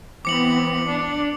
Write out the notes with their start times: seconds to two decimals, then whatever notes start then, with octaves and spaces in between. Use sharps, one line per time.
0.25 E3 B3 C4 D6 C#7 F#7
0.86 D4